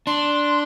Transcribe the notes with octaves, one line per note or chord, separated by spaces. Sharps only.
D4 C6